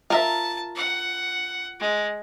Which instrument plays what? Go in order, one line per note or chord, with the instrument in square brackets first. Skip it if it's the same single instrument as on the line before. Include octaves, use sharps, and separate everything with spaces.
[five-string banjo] F4 A#4 E5 [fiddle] A5
[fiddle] F#5
G#3